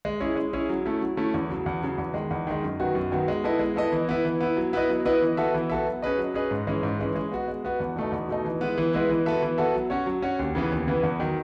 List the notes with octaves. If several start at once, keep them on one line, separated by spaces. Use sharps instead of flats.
G#3
C#4 E4 G#4 C#5
G#3
C#4 E4 G#4 C#5
F#3
A3 C#4 E4
F#3
A3 C#4 E4
E2
C#3 F#3
E2
C#3 F#3
E2
D#3 G#3
E2
D#3 G#3
F#2
D#3 F#3 B3 F#4
F#2
D#3 F#3 B3 F#4
G#3
B3 E4 A4 D#5
G#3
B3 E4 A4 D#5
E3
B3 E4
E3
B3 E4
F#3
B3 E4 B4 D#5
F#3
B3 E4 B4 D#5
E3
B3 F#4 A4 E5
E3
B3 F#4 A4 E5
F#3
C#4 G#4 B4 D#5
F#3
C#4 G#4 B4 D#5
G#2
E3 G#3 C#4
G#2
E3 G#3 C#4
G#3
B3 F#4
G#3
B3 F#4
E2
B2 A3 D#4
E2
B2 A3 D#4
E3
G#3 B3 E4 B4
E3
G#3 B3 E4 B4
E3
B3 F#4 A4 E5
E3
B3 F#4 A4 E5
F#3
C#4 F#4 C#5
F#3
C#4 F#4 C#5
D#2
C#3 E3 B3
D#2
C#3 E3 B3
E2
D#3 F#3